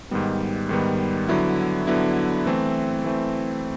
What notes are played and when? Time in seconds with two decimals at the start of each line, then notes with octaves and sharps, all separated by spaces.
0.11 G#2 D#3 G3 B3
0.69 G#2 D#3 G3 B3
1.29 D3 F#3 B3 E4
1.87 D3 F#3 B3 E4
2.46 E3 A3 C4
3.04 E3 A3 C4